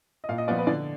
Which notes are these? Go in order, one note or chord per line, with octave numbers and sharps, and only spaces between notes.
D#5
A#2 F5
D#5
F3 B3 F4 D5
B4
D3 D5